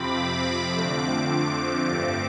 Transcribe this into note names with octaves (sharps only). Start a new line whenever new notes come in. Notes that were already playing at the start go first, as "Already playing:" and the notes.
Already playing: F2 C3 F3 C4 B5 D6
D6
F2 D3 F3 A3 C4
D6
G2 F3 A3 C4